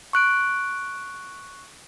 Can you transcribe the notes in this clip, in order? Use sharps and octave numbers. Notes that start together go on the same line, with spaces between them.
C#6 F#6 D7